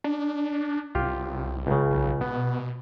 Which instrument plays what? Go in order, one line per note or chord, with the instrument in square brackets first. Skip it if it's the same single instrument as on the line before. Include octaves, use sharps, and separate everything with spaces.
[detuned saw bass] D4
[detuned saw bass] C2 [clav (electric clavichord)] F4 G4
[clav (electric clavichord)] C#2 C#3
[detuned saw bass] B1
[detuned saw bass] B2 [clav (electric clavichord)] B3